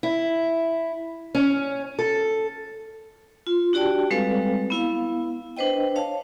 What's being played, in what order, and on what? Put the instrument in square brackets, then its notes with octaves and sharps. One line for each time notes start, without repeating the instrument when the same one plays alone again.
[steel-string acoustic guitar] E4
C#4
A4
[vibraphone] F4
D4 F#4 G4 D5 G5 A5
G3 G#3 C4 A4 B4 F5
B3 E4 F5
D4 B4 C5 D#5 G5
C#5 F5 A5